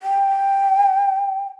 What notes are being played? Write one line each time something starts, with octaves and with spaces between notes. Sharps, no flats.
G5